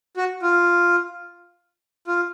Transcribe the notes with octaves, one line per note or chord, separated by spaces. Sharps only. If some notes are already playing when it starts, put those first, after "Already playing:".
F#4
F4
F4